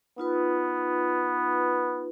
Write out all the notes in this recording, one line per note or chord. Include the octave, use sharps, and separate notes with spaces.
B3 D#4 F4 B4